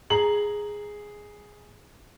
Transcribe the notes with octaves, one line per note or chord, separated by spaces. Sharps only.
G#4 A#5 F#7